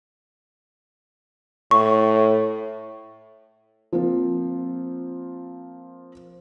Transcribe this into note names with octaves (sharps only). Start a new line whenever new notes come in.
A2 C#6
F3 A#3 C4 F4